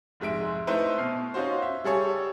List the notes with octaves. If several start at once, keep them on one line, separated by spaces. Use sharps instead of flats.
F1 G#2 G#3 E5 D7
A3 D#4 E4 B4 C5
B2 F6 C7
C#4 D#4 F4 F#4 C5
E5
G3 G#4 A4 C#5